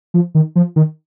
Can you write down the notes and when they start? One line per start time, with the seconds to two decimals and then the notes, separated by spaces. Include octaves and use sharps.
0.14 F3
0.35 D#3
0.56 F3
0.76 D#3